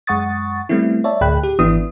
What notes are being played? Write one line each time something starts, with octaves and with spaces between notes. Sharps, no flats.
F#2 G#3 F#5 C#6 D#6 A6
G3 A3 B3 C4 E4
C#5 D5 E5 A5
D2 A2 G#4 G5 B5 F#6
G4
G#1 E3 B3 D4 E4 D#6